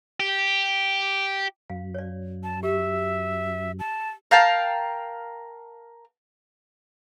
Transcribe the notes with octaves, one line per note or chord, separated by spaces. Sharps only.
G4
F#2 F5
C#5 D5
A5
G4 E5
A5
A#4 F5 G5 A5